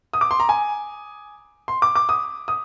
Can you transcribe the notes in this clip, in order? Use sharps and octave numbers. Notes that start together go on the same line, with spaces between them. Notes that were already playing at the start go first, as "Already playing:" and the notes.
D#6
D6
C6
A#5
G#5
C6
D6
D6
D#6
D#6